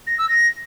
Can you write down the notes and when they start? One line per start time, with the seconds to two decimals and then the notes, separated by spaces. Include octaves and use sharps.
0.06 A#6
0.17 E6
0.28 A#6